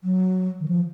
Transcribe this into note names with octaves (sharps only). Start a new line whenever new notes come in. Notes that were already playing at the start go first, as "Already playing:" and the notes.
F#3
D#3
F3